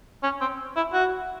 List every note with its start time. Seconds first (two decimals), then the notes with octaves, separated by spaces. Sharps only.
0.23 C#4
0.41 C4
0.76 E4
0.93 F#4